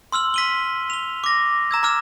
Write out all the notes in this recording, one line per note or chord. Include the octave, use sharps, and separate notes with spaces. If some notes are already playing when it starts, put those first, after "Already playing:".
C6 E6 F6 F#7
B6 D#7 G7
F7 G7
D6 A#6
A#5 E6 G#6
A#5 D6 F6 E7